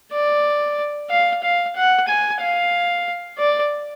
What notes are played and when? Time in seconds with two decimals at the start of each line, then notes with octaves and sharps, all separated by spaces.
0.12 D5
1.10 F5
1.43 F5
1.76 F#5
2.08 G#5
2.41 F5
3.38 D5